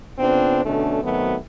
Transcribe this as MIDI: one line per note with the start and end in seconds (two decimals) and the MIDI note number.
0.18 0.61 49
0.18 0.61 59
0.18 0.61 60
0.18 0.61 62
0.18 0.61 65
0.18 0.61 72
0.64 0.98 47
0.64 0.98 50
0.64 0.98 57
0.64 0.98 61
0.64 0.98 62
1.03 1.35 51
1.03 1.35 54
1.03 1.35 57
1.03 1.35 59
1.03 1.35 60
1.03 1.35 66